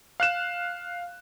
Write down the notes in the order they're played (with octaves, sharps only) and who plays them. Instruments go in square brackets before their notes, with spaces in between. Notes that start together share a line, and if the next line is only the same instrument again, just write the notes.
[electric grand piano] F5 F#6 E7